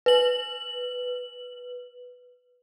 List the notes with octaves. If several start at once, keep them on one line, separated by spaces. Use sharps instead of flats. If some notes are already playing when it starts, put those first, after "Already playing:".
B4 F#7